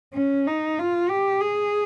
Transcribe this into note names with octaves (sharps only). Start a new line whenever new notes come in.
C#4
D#4
F4
G4
G#4